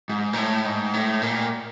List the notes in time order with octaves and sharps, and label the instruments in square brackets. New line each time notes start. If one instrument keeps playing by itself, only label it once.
[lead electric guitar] G#2
A#2
A2
G#2
A2
A#2